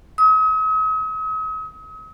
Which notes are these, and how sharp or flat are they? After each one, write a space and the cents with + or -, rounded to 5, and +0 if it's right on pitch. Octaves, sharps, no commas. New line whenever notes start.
D#6 +45